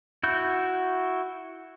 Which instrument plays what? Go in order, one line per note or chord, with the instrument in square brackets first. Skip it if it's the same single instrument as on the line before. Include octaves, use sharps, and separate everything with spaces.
[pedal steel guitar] E4 F#4 G6